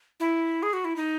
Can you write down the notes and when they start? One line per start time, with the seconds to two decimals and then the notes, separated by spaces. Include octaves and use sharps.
0.20 E4
0.63 G#4
0.73 F#4
0.85 E4
0.96 D#4